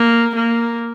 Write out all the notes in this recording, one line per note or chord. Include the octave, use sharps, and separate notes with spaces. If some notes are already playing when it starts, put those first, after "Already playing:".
Already playing: A#3
A#3